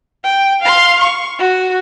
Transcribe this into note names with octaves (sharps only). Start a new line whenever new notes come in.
G5
F5 C6
C#6
F#4